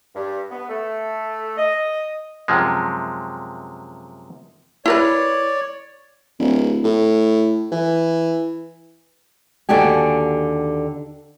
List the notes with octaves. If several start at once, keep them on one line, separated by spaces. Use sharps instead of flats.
G2
B3
A3
D#5
F#2 C3 F3 G#3
E4 A#4 B4 C#5 D5
D1
A2
E3
D#2 D3 D4 F#4 G4 G#5